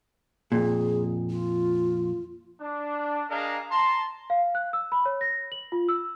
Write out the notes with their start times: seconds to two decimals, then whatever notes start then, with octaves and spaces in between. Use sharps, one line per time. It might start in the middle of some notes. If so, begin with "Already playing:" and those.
0.52 F2 A#2 G#4
1.30 F4
2.60 D4
3.29 D4 G#4 A#4 D#5 F5 A#5
3.71 A5 A#5 C6
4.30 F5
4.55 F#6
4.73 E6
4.92 B5
5.06 C#5
5.21 A#6
5.52 F#7
5.72 F4
5.89 E6